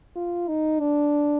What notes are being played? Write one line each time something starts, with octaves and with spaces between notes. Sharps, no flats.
F4
D#4
D4